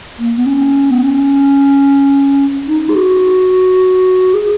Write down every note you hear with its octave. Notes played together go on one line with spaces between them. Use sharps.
A#3
B3
C#4
B3
C#4
D#4
G#4
F#4
G#4